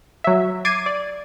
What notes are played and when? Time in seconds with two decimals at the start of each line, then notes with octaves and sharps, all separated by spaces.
0.24 F#3 E5
0.65 D6 G#6 A6 C7 D#7
0.86 D5